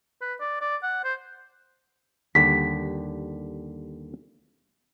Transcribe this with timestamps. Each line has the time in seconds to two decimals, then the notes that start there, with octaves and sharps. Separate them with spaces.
0.22 B4
0.40 D5
0.61 D5
0.83 F#5
1.04 C5
2.35 D#2 D3 G3 B6